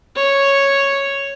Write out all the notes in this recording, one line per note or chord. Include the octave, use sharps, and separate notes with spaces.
C#5